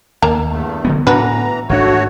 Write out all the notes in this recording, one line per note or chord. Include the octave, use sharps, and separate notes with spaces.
D#2 A#3 A#5
E2 G2 A3
D3 F#3 B3
A2 E3 B3 D4 F#4 B4 A#5
G#1 D3 A3 D4 F#4 C#5